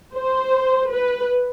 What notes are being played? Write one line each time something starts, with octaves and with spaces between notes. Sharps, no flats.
C5
B4